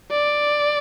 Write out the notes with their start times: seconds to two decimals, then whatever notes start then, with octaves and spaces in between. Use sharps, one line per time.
0.11 D5